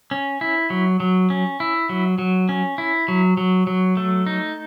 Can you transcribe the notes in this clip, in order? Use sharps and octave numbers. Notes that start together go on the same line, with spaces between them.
C#4
E4
F#3
F#3
C#4
E4
F#3
F#3
C#4
E4
F#3
F#3
F#3
A3
D#4